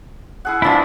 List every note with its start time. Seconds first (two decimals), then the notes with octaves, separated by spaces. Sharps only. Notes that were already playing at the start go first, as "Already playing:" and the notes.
0.45 E4 G#4 F#5
0.62 E3 F3 D4 E4 F4